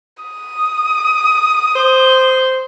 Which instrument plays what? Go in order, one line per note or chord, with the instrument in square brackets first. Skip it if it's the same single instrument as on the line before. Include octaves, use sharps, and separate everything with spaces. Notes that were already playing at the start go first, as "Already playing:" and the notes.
[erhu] D#6
[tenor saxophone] C5